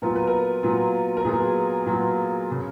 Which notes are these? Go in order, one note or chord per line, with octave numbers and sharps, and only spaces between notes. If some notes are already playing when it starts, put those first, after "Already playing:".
A#2 F#3 B3 F4 A#4
B4
A#4
A#2 F#3 B3 F4
A#4
A#2 F#3 B3 F4 G#4
A#2 F#3 B3 F4
C#3